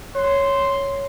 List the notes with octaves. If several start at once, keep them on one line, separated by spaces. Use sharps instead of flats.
C#5 C6